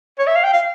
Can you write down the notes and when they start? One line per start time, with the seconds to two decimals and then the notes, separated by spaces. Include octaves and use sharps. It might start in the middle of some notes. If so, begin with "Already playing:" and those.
0.19 C#5
0.27 E5
0.35 F5
0.44 G5
0.53 F5